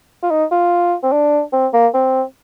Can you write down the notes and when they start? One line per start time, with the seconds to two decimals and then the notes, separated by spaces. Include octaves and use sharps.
0.23 F4
0.31 D#4
0.52 F4
1.03 C4
1.12 D4
1.53 C4
1.74 A#3
1.94 C4